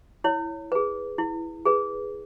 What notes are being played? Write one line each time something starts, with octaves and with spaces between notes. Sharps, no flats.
E4 C#5
G#4 B4
E4
G#4 B4